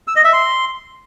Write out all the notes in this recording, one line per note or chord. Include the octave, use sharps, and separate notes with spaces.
E6
D#5
E5
C6